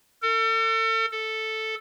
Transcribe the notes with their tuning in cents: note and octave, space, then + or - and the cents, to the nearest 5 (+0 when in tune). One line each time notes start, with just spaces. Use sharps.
A4 +40
A4 +0